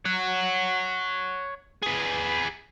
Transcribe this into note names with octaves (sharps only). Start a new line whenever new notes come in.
C#5 F#5
G#4 B4